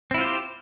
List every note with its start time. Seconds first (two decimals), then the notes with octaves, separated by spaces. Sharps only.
0.11 C4
0.14 E4
0.18 F4
0.21 C5
0.24 G4